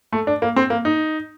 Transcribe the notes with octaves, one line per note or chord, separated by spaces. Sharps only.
A3
D4
A#3
C4
A#3
D#4